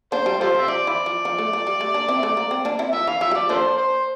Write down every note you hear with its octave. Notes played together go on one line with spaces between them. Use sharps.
A#3 D4 C5
G3
G3 F4 A4 C5
G3 E5
F3 D5
E3
F3
F3
A3
F3
G3
A3
A#3 D4
C4 E4
A3
A#3
C4
A#3 D4
C4 E4
F3 E5
E3 F5
F3 E5
G3
F3 D5
A#3 D4 F4 A4 C5
C5